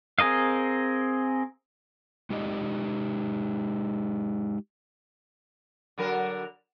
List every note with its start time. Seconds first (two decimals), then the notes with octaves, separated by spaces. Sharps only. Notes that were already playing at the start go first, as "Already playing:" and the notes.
0.19 C4 G#4 A#4 D#5 F5
2.30 G#3 D#4 G4 D5 D#5
5.98 D3 F#3 A#4